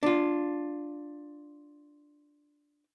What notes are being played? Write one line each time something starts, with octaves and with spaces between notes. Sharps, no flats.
D4 F4